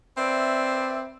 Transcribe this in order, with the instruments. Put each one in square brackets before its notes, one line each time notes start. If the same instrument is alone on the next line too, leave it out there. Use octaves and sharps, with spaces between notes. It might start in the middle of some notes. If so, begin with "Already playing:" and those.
[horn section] C4 B4 D5 E5